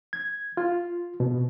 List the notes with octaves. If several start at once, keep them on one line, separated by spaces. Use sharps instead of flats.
G#6
F4
B2